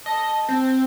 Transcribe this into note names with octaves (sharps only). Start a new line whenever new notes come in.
D#5 A5
C4